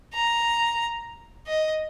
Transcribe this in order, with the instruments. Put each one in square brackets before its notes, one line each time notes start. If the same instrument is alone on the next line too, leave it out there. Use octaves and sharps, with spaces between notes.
[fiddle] A#5
D#5